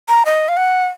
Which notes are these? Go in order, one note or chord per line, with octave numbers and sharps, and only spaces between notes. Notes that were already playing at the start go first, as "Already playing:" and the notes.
A#5
D#5
F5
F#5